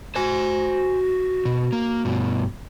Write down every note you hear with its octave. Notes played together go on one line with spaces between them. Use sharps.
F#4 C5 G#5
B2
A#3
G2 B2